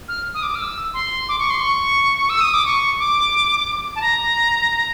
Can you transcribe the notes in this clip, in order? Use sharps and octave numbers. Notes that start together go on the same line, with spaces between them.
F6
D#6
D6
F6
E6
C6
D6
C#6
C6
C#6
E6
D#6
D6
C#6
D6
A5
A#5